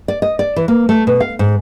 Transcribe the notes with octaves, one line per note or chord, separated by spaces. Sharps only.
D5
D#5
D5
E3
A#3
A3
B2
F5
G#2